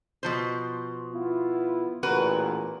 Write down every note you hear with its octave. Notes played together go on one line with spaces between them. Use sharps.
B2 F3 C5
B3 E4 F4
A1 E2 A#2 F#4 A#4 B4